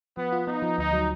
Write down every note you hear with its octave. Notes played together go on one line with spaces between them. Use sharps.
F3 B3
F4
B3 D#4
F3
D2 D#4
F#3